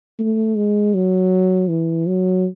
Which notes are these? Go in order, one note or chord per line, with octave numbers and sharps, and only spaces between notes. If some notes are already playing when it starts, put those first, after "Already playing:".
A3
G#3
F#3
E3
F#3